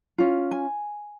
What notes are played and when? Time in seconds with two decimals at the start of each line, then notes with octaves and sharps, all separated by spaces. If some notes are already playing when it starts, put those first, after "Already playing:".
0.18 C#4 F4
0.51 G#5